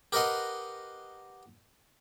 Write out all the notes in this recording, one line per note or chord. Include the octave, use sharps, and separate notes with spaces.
G4 A#4 B4 D#5 F#5 C6